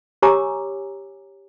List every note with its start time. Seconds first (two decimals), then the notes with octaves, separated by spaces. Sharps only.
0.22 G4 C#5 G#5 A#5 D6 E6